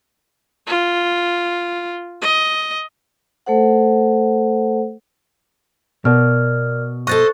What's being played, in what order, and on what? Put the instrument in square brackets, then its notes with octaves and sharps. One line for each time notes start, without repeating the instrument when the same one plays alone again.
[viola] F4
D#5
[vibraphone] A3 A4 C5 F#5
[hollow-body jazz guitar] B2 [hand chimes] A#4 D5 F6
[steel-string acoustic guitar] A4 C5 D#5 [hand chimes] C#6 F#6 A6